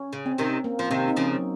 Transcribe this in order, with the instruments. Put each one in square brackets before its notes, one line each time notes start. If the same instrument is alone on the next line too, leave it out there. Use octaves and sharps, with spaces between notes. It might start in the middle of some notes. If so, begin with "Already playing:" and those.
Already playing: [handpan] C#4
[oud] C#3
[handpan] C4
[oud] C3 D#3
[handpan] A#3
[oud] F3
[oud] C3 D#3 [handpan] C4
[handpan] D#4
[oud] C#3 F3 [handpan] C#4
[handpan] F#3